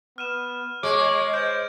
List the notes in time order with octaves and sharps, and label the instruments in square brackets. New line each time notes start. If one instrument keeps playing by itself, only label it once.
[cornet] B3 [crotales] F6 D#7 E7
[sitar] G#3 [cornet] C#5 [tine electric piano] D6
[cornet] C5 [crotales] G6 D7